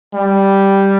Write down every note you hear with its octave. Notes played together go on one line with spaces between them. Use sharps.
G3